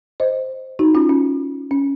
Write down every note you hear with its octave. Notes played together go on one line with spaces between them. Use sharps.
C5 D#5
D#4 F#4
C#4 F4
C#4
C#4